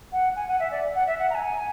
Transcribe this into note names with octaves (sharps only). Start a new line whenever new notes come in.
F#5
G#5
F#5
E5
D5
F#5
E5
F#5
A#5
G#5